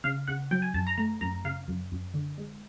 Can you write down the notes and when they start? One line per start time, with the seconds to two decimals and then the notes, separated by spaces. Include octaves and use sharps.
0.04 C#3 F5
0.27 C#3 F#5
0.51 F#3 G5
0.62 G#5
0.74 F#2 A5
0.87 A#5
0.98 A3 A#5
1.21 F#2 A#5
1.44 C#3 F5
1.68 F#2
1.92 F#2
2.14 D3
2.38 G#3